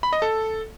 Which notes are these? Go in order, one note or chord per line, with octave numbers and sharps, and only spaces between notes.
B5
D#5
A4